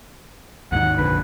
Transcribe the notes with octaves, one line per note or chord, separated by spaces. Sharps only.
D#2 G#2 D#3 F#5
A#1 F2 D3 B4